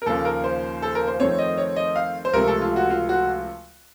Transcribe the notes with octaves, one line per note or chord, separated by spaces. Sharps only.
A#4
D#2 C#3 F3 A#3 A4
A#4
C5
A4
A#4
C5
F2 D#3 A3 C4 C#5
D#5
C#5
D#5
F5
C5
C#2 C3 F3 A3 A#4
A4
F4
F#4
F4
F#4